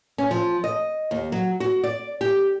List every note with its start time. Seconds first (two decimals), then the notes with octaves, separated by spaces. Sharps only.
0.18 C#4
0.31 F3
0.64 D#5
1.11 D#2
1.32 F#3
1.60 F#4
1.84 D5
2.21 G4